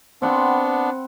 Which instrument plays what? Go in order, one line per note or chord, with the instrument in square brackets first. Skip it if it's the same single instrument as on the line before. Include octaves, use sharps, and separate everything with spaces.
[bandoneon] B3 D4 [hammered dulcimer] C4 F#5 B5